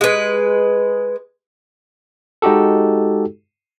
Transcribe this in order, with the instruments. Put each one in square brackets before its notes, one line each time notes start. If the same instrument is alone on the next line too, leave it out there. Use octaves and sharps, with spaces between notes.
[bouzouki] G#3 B4
[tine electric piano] G#3 D#4 F#4 G4 A4